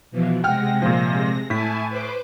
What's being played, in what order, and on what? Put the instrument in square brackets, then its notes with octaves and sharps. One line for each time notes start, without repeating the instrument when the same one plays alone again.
[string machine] B2 E3 F3
[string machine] C3 G#3 A#6 [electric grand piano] F#5 G5 F6
[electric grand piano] A#2 F3
[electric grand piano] A2 B6 [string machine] E4 G#5 A5
[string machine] B4 C5 D6